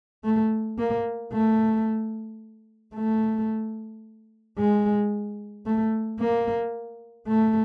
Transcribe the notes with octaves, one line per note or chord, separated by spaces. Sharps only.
A3
A#3
A3
A3
G#3
A3
A#3
A3